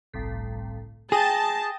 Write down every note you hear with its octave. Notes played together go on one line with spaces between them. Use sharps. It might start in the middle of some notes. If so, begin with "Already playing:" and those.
G1 C2 A2
G#4 G5 A5 D#6 A#6